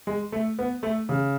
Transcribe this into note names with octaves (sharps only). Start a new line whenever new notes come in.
G#3
A3
B3
A3
C#3